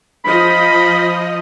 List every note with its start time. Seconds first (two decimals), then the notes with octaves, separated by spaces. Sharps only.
0.25 F3 D#5 B5